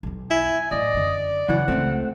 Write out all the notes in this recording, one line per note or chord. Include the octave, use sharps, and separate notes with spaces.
B1 E2
E4 G#5
F#2 A2 D5 D#5
F#2 D3
F#2 C#3 E3 F#5
C#2 A3 C4 F4